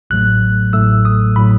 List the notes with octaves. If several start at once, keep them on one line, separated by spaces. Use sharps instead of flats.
A1 A2 F#3 A3 F#6
A1 A2 F#3 A3 E6
D#6
A2 F#3 A3 B5